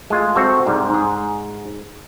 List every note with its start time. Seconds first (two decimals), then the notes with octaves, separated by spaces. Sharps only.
0.10 G#3 A3 F4
0.35 C4 F#4 A4 E5
0.66 C2 G#2 G3
0.90 G#2 G#4